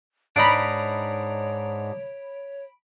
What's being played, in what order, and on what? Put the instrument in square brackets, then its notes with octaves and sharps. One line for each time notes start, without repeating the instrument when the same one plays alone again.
[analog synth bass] G#2 [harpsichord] D4 D#4 A#5 [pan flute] C#5 [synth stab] B5 D7